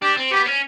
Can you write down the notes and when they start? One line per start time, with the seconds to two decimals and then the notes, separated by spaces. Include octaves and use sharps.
0.02 D4 G4
0.17 C4
0.31 B3 G4
0.46 C#4